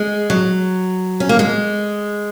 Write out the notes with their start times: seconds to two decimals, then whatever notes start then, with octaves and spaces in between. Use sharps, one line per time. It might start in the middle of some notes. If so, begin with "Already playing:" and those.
Already playing: G#3
0.30 F#3
1.20 C#4
1.29 A#3
1.39 G#3